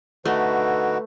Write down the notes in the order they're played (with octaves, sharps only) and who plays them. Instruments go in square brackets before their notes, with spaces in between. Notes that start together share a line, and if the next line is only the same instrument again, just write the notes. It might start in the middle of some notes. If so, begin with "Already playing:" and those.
[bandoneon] D3 D#4 F#4 [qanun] A3 [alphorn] B4